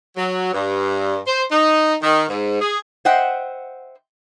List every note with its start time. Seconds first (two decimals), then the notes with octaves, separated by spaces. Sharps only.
0.16 F#3
0.54 G2
1.27 C5
1.51 D#4
2.02 D#3
2.29 G#2
2.61 G#4
3.05 C5 D#5 E5 F#5 G5